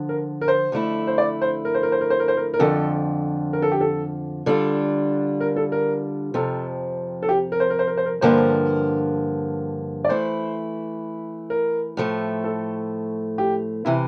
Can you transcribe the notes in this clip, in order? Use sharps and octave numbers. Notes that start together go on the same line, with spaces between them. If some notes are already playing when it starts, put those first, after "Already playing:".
Already playing: D3 F3
A#4
A#4
C5
F2 D3 A3 E4
C5
D5
C5
A#4
C5
A#4
C5
A#4
C5
A#4
C5
A#4
A#4
F2 D3 F3 A4
A#4
A4
G4
A4
D3 G3 D4 F4 A4
A#4
A4
A#4
F2 C3 F3 A4
A4
G4
A#4
C5
A#4
C5
A#4
C5
A#4
G2 D3 F3 A#3 C5
D5
E3 A3 E4 C5
A#4
A2 F3 A3
A4
G4
C3 E3 E4